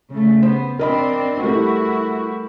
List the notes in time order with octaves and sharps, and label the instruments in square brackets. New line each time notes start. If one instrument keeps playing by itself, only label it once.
[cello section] C#3 A3
[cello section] B3 [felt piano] C5
[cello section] C4 D4 [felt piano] A#4 D#5 B5
[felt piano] G3 A3 A#4 [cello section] E4 F#4